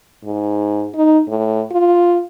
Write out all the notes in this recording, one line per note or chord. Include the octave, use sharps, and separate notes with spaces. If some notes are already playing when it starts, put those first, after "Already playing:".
G#2
D#4
A2
F4